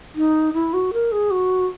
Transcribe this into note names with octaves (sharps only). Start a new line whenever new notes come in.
D#4
E4
F#4
A#4
G#4
F#4